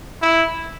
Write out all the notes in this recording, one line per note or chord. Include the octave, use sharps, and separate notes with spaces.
E4